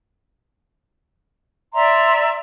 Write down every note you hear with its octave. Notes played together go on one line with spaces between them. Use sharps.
D5 E5 A#5 C6